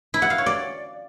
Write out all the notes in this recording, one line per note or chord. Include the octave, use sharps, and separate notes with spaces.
E4
F#5
F5
C#5
D5